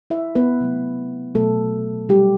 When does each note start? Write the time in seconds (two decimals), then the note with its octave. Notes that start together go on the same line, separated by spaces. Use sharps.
0.10 E4 E5
0.35 B3 B4
0.61 C3 F#3 A3
1.35 B2 F#3 A3 A4
2.09 C3 F#3 G3 A3 G4